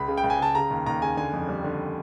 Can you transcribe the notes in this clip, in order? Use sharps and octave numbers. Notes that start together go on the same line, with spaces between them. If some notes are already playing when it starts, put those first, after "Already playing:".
Already playing: C#2 B5
C#3
G5
C#2
G#5
C#3 A5
C#3 A#5
D#2
D#2 A#5
C#3 G#5
D3 G#5
F2
G3
D3